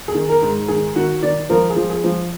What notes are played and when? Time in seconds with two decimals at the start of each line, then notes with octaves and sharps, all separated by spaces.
0.08 G#4
0.15 D#3
0.29 A#4
0.42 G#2
0.68 D#3 G#4
0.96 D#3 F#4
1.23 D#3 D5
1.49 F3 A#4
1.70 G#4
1.76 F3
1.89 G#4
2.04 F3